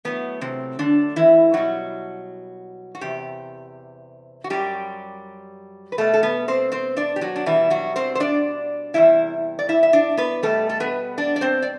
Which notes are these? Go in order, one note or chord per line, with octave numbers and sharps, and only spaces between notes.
A2 F#3 B3
C3 C4
D3 D4
E3 E4
B2 F#3 G3 F#4
F#4
E2 C3 G4
F#4
F#2 F#3 G3 G4
B4
B2 G3 A3 A4
A4
B3 B4
C4 C5
C4 C5
D4 D5
G4
F#3 F#4
D4
B2 E3 G3 E4
F#3 F#4
C4 C5
C5
D4 D5
E2 C3 E3 G3 E4 E5
D5
E4 E5
E5
D4 D5
B3 B4
B2 G3 A3 A4
A4
B3 B4
D4 D5
D5
C4 C5
D5